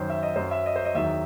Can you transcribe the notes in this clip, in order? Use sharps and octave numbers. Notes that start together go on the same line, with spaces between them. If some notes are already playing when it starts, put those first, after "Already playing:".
Already playing: F#2 D#3 F#3 C5
E5
D#5
F#2 F#3 C5
E5
D#5
C5
D#5
E2 D#3 F#3 E5